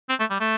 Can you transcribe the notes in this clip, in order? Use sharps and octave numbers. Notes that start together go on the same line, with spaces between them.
C4
A3
G3
A3